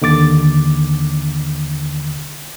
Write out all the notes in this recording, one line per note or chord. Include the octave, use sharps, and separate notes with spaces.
D#2 D3 D6 A6